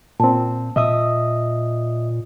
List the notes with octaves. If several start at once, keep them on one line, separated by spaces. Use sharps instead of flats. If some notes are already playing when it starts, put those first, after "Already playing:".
A#2 C4 A5
A#2 D#5 E5 D#6